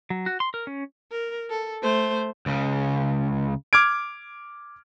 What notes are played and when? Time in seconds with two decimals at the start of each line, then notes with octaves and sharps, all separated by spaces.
0.10 F#3
0.26 F#4
0.40 C6
0.54 A#4
0.67 C#4
1.12 A#4
1.50 A4
1.82 A3 C5
2.46 C#2 C#3
3.73 D6 F6 G#6 D7